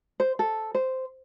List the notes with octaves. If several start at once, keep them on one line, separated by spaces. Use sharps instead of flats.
C5
A4
C5